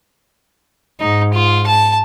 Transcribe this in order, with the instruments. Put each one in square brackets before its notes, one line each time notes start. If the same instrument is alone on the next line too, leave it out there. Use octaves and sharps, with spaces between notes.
[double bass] G#2 [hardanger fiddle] D#4
[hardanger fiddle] F4
A5